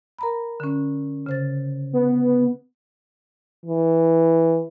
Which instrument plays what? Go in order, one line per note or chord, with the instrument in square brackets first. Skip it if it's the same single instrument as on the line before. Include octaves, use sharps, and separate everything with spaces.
[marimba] A#4 A#5 B5
D3 C#4
C#3 C5 A6
[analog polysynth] B3
[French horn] E3